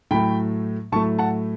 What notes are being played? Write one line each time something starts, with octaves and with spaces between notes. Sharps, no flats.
A2 F#3 A3 G5 B5
A2 F#3 A3 A5 C#6
F#5 A5